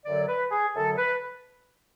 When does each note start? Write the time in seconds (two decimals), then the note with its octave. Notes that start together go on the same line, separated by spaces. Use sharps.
0.06 F#2 D3 F#3 D5
0.28 B4
0.51 G#4
0.75 F#2 D3 F#3 A4
0.97 B4